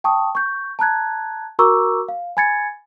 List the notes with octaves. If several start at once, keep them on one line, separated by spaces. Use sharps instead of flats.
G5 A5 C#6 D#6
C#6 G6
A5 A#5 F#6 G#6
F#4 A#4 A#5 C#6 D6 E6
F5
G#5 B5 G#6 A6 C#7